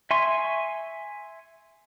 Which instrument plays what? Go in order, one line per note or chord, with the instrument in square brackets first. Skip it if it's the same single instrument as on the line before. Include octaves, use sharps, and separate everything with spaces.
[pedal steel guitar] E5 G#5 C6 C#6